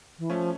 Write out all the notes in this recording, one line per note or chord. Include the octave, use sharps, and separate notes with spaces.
E3
F3 A3 C#4